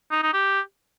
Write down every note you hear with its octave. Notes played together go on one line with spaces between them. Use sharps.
D#4
D#4
G4